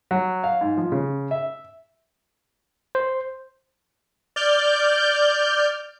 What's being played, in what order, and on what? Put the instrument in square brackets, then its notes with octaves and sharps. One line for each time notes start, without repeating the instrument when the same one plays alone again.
[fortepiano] F#3
F5
G#2
F3
C#3
E5
[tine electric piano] C5
[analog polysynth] D5 F6 G6